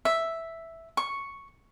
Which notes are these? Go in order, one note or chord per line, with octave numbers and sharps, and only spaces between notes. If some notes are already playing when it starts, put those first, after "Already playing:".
E5
C#6